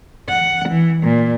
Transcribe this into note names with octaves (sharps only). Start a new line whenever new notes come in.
F#5
E3
A#2